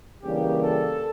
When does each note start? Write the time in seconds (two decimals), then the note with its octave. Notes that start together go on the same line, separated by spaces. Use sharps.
0.22 C#3 E3 G3 A#3 D4 G4
0.62 A4